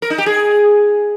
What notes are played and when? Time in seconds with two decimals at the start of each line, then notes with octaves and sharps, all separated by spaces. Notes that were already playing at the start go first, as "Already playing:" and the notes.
0.02 A#4
0.10 D#4
0.18 G4
0.26 G#4